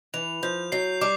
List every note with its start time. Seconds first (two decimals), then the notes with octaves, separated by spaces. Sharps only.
0.14 E3 F7
0.43 F3 G6
0.72 F#3 C7
1.01 G3 D6